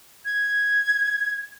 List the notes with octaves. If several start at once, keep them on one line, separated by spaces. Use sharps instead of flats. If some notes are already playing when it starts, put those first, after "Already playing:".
G#6